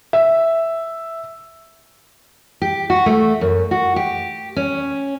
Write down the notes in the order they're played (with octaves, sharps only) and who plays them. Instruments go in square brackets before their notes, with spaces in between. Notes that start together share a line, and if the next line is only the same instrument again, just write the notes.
[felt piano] E5
[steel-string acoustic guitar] G4
F#4
A3
F#2
F#4
G4
C#4